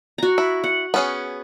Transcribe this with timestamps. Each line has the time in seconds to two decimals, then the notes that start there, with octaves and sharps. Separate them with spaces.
0.18 F#4 A#5
0.38 E4
0.64 F#5
0.94 B3 C#4 G#4